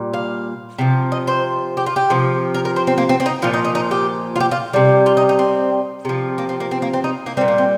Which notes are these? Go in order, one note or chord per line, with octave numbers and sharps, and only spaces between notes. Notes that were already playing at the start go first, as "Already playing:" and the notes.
Already playing: A#2 G3
F5
C3 F3
D#5
C5
G4
F4
G4
C3 F3
A#4
A#4
C5
C4
A#3
C4
C4
D#4
A#2 F3 F4
D#4
D#4
D#4
G4
F4
G4
F4
C3 G3
F4
D#4
D#4
C4
C3 F3
A#3
C4
A#3
C4
A#3
C4
D#4
A#3
A#2 G3 C4
A#3
C4